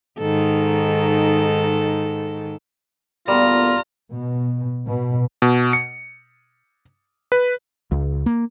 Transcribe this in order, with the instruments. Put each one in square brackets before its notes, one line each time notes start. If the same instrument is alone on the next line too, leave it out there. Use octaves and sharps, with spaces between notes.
[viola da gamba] G#2 D#3 A4
[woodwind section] D2 A#2 B3 [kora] G3 [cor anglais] F4 [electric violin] A#5
[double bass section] B2
B2
[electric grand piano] B2
C#7
B4
[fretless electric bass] C#2
A#3